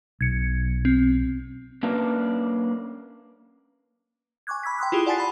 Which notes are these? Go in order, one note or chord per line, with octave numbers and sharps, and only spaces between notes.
B1 G#6 C#7
C4
A#3 C#4 D4 B4 D5 F5
G#5 C#6 D6 F#6 G#6
B5 E6 G#6 B6
G5 C6 D#6 F#6
E4 F4 G4 G#4
D5 F#5 G#5 A5 A6 C7
F#5 B5